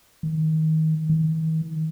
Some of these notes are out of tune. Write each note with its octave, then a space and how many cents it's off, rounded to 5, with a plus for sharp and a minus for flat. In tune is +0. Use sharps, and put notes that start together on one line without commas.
D#3 +25
D#3 +40